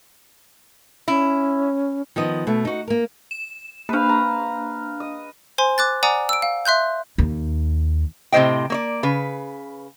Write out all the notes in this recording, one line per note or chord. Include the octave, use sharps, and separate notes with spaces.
C#4 E4
D#3 F3 B3 D#5
B2 A3
D#4 F#4
A#3 A#4
E7
A#3 D4 B4 F5
A#5
D#5
C5 G#5 C6
D6 F#6 A6
D5 F#5 G#5 A#5 D6 D#6
E6 D7
F5
E5 C6 F#6 G6
D#2
A2 C3 C#4 C5 D#5 G5
A#3 C#5 D5
C#3 B4